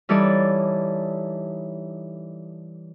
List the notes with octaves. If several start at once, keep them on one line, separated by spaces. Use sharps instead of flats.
E3 G3 D#4 A4 C#5 D5